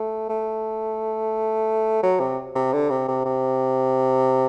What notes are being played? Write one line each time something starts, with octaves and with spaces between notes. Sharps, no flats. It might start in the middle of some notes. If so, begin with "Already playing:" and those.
Already playing: A3
A3
F#3
C3
C3
D3
C3
C3
C3